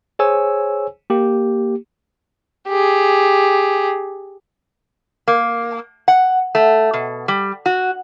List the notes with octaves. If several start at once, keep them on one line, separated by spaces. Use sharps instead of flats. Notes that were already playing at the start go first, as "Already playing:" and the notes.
G#4 C5 C#5 G#5 E6
A#3 G4
G4 G#4
A#3
F#5
A3
B2
G3
F#4